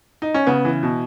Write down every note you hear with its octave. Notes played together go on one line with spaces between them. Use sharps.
D#4
C#4
C#3 B3
E3
B2